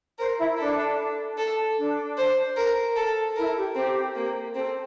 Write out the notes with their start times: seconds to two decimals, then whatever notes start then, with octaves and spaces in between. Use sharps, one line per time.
0.19 A#4 C5
0.38 E4
0.58 D4 A4
1.38 A4
1.77 D4
2.18 C5
2.57 A#4
2.97 A4
3.36 E4 A#4
3.56 G4
3.75 C4 G4
4.16 A#3
4.55 C4 A4